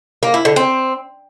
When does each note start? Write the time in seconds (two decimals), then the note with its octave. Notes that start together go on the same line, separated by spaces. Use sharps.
0.23 A#3
0.34 E4
0.45 D3
0.56 C4